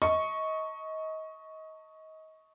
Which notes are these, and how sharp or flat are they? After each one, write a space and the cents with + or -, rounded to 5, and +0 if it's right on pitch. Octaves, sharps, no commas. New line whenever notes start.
D#5 +25 A5 +35 C#6 +0